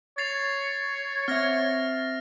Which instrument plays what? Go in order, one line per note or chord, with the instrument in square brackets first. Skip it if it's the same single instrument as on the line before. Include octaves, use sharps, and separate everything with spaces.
[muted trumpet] C#5 [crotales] A6 C7 F7
[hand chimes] C4 E5 [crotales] F6 A#6